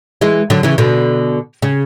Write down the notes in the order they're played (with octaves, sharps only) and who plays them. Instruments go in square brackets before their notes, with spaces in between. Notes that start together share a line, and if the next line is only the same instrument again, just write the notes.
[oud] E3 G#3
D3 F#3
C#3 E3
B2 D3
C#3